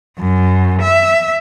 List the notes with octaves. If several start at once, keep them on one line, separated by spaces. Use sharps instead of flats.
F#2
E5